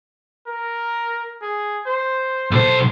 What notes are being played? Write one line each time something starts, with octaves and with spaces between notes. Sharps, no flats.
A#4
G#4
C5
B1 A4 C5